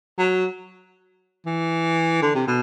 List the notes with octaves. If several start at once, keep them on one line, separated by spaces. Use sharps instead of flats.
F#3
E3
D3
C3
B2